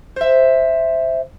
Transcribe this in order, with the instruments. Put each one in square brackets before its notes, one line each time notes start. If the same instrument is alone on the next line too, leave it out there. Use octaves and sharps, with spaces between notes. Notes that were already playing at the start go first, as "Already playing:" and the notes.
[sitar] C5 E5